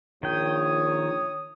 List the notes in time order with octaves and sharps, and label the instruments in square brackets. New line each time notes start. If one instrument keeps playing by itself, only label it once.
[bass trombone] A#1 [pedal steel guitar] D#3 G5 [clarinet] C#5 [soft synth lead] D#6